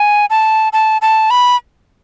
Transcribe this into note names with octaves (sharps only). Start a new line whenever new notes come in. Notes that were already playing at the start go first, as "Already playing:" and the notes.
Already playing: G#5
A5
A5
A5
B5